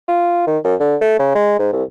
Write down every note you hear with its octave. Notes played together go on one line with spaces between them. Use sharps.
F4
D#3
F#2
D3
A3
C#3
G#3
G#2
C2